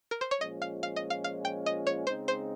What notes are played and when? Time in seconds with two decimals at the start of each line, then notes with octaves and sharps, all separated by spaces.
0.11 A#4
0.21 C5
0.31 C#5
0.40 A#2 F3 G#3 C#4 D#5
0.62 F5
0.83 F5
0.96 D#5
1.10 F5
1.24 F5
1.45 G5
1.66 D#5
1.87 C#5
2.07 C#3 G#3 C4 D#4 C5
2.28 C5